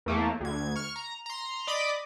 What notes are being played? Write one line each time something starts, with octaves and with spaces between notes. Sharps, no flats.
E2 A3 A#3
D2 G#6
C#6 F6
A#5
A#5 C6
D5 D#5 B5 D6 D#6 B6